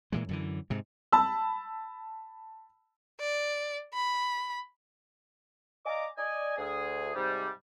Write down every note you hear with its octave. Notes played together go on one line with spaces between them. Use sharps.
A#2 E3 G#3
F#2 D3 E3
G#2 C3
A5 B5 E6
D5
B5
D5 D#5 F5 G#5 A#5 D6
D5 D#5 G#5
D2 G#4
G#2 C3 G3